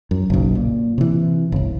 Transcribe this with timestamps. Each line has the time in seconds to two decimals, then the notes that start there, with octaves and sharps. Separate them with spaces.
0.11 F#2
0.30 F#1 B1
0.55 A#2
0.98 C3 E3
1.52 G1 C2